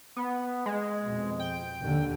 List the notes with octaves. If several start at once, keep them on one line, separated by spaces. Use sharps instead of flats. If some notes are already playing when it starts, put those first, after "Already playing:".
B3
G#3
F2 B2
G5
D#2 D3